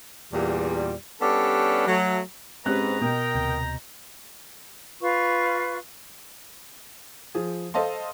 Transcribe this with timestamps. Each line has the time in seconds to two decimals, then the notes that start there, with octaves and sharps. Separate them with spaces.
0.32 E2 A#2 G3
1.21 G3 B3 C#4 D4 G4 A4
1.87 F#3 A3
2.66 G#2 G#3 C4 C#4 G4 B4 A#5 F#6
3.01 B2 A#4 D#5 G5
3.35 D2 C3 G6
5.02 F4 B4 F5 C#6
7.35 F3 G#4
7.74 A4 C5 D#5 F5 A5 C6